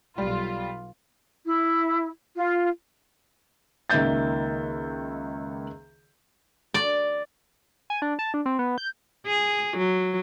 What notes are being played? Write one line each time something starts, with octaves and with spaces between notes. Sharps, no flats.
B1 G3 F4
E4
F4
C#2 D#3 A#3 E5 G6 A6
D5
G#5
D4
A5
D4
C4
B3
G6
G#4
F#3